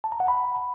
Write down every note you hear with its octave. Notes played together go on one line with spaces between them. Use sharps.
A5
A#5
F#5
B5